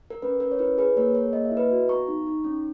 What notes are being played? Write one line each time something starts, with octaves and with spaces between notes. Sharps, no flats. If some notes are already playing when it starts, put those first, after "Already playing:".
A#4
C#4 B4
C#4 A#4
C#5
E4 B4
G#4 B4
A#3 A#4 C#5
G#4 A#4 C#5
A#3 D#5
E5
E4
B4 D#5
F#4
B3 A#5 C#6
D#4
D#4
C#4